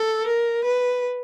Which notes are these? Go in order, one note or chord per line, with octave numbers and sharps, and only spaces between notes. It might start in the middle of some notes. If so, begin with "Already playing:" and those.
Already playing: A4
A#4
B4